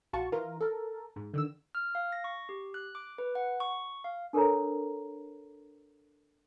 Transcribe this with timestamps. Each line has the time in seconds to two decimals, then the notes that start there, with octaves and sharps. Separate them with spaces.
0.13 A#1 F4 F#4 A5 C#6
0.32 E3 F4 A#4
0.60 A4 A#4
1.16 G#2
1.34 D3 D#3 E6
1.75 F6
1.95 F5
2.12 A#6
2.24 C#6
2.49 G4
2.74 F#6
2.95 D6
3.18 B4
3.35 F#5
3.60 C#6
4.04 F5
4.33 D4 A4 A#4 C5 C#5 A#5